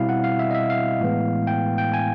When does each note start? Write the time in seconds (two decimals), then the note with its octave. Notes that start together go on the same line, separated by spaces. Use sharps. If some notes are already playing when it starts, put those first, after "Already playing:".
Already playing: B2 G3 C4 E4 F5
0.09 F#5
0.24 F5
0.39 E5
0.51 D#5
0.54 E5
0.70 F5
1.01 A2 E3 G#3 B3
1.47 G5
1.78 G5
1.94 G#5